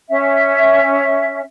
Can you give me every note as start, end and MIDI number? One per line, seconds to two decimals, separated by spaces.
0.10 1.40 61
0.10 1.40 76